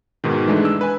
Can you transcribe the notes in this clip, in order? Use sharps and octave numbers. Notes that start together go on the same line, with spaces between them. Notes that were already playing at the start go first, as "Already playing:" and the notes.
G#2 B2 D#3
E3 G#3 A3 D4 D#4
E6
B4 G#5